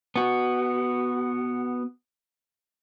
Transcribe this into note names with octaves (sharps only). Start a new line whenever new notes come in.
B3 F#4